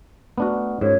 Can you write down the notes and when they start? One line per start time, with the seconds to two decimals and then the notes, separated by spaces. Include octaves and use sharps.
0.38 A3 B3 D4 F#4 F6
0.81 G#2 C#4 F4 A#4 C#5